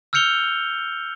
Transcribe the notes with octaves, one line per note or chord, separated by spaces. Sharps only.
E6 F6 G6 C#7 F7 G7